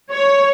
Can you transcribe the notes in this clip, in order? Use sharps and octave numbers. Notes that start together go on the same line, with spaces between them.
C#5